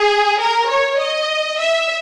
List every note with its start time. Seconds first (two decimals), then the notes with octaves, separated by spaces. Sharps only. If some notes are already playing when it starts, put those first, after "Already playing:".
Already playing: G#4
0.40 A#4
0.69 C#5
0.99 D#5
1.60 E5